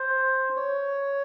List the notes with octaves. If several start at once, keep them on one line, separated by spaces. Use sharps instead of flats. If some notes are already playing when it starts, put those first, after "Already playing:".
Already playing: C5
C#5